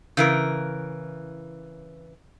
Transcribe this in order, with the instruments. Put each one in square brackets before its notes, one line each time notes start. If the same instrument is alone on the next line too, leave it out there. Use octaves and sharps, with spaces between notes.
[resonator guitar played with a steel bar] C#3 E3 A#4